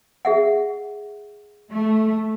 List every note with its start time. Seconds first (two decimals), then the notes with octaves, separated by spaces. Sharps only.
0.25 G#4 E5 F#5
1.70 A3